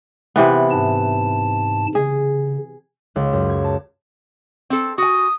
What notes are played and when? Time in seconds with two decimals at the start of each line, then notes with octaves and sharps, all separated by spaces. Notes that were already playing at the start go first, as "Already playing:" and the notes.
0.36 C3 E3 B3
0.71 G#2 A5
1.95 C#3 G#4
3.16 C#2
3.33 F#2
3.50 G#6
3.64 A5
4.70 C4 A4
4.98 F#4 G#5 D#6